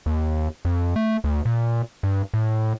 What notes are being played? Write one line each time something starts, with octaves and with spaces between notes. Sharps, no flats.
D#2
F2
A3
D2
A#2
G2
A2